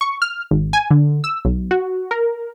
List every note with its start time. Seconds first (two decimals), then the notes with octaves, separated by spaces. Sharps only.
0.01 C#6
0.22 F6
0.51 G#1
0.73 G#5
0.91 D3
1.24 E6
1.45 B1
1.71 F#4
2.11 A#4